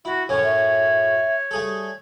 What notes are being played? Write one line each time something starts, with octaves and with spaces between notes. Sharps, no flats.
E4 F#4
F#2 A2 F3 C#4 C#5
E5
G3 A3 G#4 A4